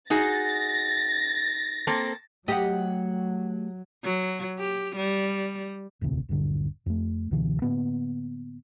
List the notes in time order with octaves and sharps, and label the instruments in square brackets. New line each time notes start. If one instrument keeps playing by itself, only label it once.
[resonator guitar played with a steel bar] D#4 F#4 G#4 [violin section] A6 A#6
[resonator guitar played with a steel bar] A#3 C4 A4
[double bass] F#3 [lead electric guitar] A3 F#5 [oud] G4 D#5
[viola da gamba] F#3
G4
G3
[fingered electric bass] E1 A1 D2 C3
D#1 A#1 G2 D3
F2 A3
C#2 B2 D3 E3
A2 D3 A#3 B3